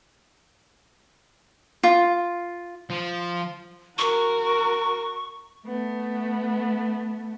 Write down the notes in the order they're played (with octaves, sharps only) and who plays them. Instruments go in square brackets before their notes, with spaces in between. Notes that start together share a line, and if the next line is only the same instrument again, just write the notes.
[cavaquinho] F4
[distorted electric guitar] F3
[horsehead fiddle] F#4 A#4 [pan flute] C#6
[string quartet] A3 B3